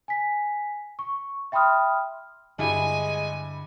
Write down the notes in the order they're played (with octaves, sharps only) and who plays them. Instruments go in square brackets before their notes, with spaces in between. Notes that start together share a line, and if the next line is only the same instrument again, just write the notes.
[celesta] G#5 B6
C#6
E5 G5 B5 C6 D#6 F6
[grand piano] G2 E4 [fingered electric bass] D3 [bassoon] G#3 [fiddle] G#5